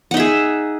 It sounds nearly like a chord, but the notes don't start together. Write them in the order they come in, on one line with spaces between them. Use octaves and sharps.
F#5 D#4 E5 G#4